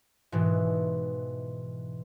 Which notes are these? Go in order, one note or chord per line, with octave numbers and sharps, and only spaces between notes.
G#2 B2 E3